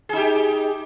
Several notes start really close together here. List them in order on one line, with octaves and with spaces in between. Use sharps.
G#4 D#4 G4